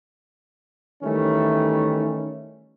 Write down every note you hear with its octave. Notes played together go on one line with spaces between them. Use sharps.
D#3 E3 G3 A3 C#4